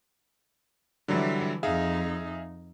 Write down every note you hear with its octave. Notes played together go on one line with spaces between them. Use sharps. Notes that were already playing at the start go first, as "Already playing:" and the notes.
D3 E3 F#3 G3
F2 D#4 G#4 E5 F5